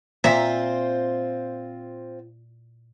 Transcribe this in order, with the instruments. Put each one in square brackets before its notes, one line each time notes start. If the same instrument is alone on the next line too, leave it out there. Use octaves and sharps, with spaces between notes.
[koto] A#2 E5 A#5 [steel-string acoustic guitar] C4 F4 C5